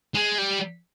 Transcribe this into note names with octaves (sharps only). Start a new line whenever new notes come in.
G#3
G3